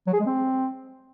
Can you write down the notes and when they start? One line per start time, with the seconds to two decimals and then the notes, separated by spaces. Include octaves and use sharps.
0.07 F#3
0.13 G#4
0.20 G#3
0.26 C4